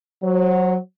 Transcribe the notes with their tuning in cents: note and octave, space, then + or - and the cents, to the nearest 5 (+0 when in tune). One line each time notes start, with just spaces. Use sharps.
F#3 +0 C5 +30